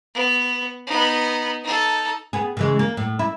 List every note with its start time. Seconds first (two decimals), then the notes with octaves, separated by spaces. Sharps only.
0.14 B3
0.87 B3 D#4
1.63 D#4 A4
2.33 B3 G#4
2.57 C#3 E3 G#3
2.79 A#3
2.97 A2
3.19 E4